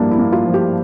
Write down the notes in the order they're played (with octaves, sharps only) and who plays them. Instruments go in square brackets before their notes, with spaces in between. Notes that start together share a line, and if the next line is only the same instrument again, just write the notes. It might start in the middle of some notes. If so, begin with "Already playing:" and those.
Already playing: [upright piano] G2 F3 A#3 [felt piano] D4 E4
[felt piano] E4
[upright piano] A#3
[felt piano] F4
[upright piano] F3
[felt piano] G4